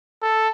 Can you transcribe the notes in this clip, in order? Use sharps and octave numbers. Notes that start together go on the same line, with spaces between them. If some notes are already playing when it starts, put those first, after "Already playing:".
A4